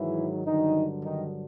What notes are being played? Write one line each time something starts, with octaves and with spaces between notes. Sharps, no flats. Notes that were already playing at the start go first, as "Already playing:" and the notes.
Already playing: G#2 D#3 E3 F#3 E4
G2 D3 D#3 F#3 D#4
D#3 D#4